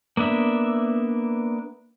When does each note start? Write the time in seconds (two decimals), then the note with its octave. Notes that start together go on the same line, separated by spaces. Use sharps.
0.17 A#3 B3 D4 E5